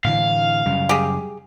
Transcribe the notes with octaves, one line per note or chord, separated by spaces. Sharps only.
A2 D3 E3 F5
F#2 C#3 G3
G4 G#4